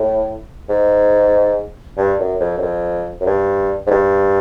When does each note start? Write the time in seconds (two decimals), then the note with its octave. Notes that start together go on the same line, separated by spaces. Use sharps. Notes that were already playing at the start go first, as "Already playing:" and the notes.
Already playing: A2
0.69 G#2
1.97 G2
2.19 F#2
2.40 F2
2.57 F#2
2.62 F2
3.20 F#2
3.26 G2
3.87 G#2
3.90 G2